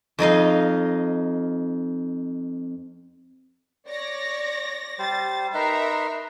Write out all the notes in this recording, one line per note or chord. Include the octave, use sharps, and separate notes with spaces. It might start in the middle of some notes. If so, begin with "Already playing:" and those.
F2 D#4 D#5 F5
C#5 D5 A#6
G3 C5 A6
D#4 A#4 B4 E5 A#5 C6